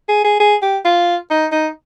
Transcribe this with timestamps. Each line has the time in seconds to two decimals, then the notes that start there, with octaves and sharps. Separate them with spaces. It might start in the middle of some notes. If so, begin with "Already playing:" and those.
0.09 G#4
0.25 G#4
0.40 G#4
0.62 G4
0.85 F4
1.31 D#4
1.52 D#4